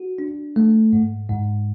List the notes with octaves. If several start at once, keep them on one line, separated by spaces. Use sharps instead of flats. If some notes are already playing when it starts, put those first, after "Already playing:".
Already playing: F#4
D4
A3
G#2
G#2